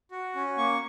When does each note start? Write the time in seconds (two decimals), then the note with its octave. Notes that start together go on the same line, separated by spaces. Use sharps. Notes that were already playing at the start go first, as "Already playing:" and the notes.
0.11 F#4
0.35 C#4
0.58 A#3 C#6